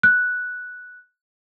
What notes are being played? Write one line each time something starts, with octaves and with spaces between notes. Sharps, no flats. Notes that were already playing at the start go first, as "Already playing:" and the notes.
F#6